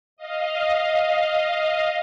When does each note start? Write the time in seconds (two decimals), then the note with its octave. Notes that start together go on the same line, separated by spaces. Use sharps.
0.17 D#5 F5